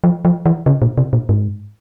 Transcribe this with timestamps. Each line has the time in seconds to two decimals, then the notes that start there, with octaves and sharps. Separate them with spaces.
0.04 F3
0.25 F3
0.46 E3
0.66 C#3
0.82 A#2
0.98 C3
1.13 A#2
1.29 G#2